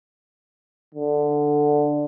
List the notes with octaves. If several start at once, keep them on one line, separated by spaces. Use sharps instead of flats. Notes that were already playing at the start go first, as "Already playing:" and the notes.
D3